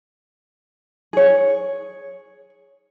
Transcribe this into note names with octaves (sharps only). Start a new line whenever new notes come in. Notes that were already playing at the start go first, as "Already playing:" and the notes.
G#4 C#5